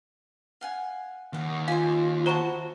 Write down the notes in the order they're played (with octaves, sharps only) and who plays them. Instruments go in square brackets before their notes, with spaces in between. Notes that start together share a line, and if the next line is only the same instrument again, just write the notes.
[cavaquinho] F5 F#5 G#5
[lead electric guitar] D#2 [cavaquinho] F5 F#5
[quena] F4 [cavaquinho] C5 G#5 [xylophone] F5
[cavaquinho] E4 F#4 A5 [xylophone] C5 A#5 C#6